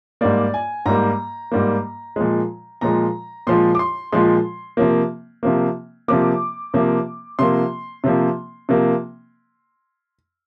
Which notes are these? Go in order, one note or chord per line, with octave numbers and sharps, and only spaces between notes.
G#2 G3 A#3 D5
G#5
G#2 G3 A#3 A#5
G#2 G3 A#3
A#2 F3 G#3
A#2 F3 G#3 A#5
A#2 F3 G#3 C6
D6
C6
A#2 F3 G#3 C6
C3 F3 A#3
C3 F3 A#3
C3 F3 A#3 D6
C3 F3 A#3
C3 F3 A#3 C6
C3 F3 A#3
C3 F3 A#3